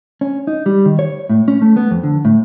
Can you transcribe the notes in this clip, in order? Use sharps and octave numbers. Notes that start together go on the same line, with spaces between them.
C#4
D#4
G3
D#3
C#5
A2
C#4
A3
B3
F2
D3
A2